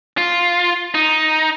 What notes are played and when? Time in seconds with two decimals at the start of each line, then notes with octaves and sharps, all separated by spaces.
0.18 F4
0.94 D#4